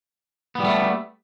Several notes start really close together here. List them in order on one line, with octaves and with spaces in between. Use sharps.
B3 G3 A3